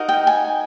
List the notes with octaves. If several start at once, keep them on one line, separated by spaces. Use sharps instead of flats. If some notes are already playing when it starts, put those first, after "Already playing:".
Already playing: D#4 F#4 A#4 D#5
G5
G#5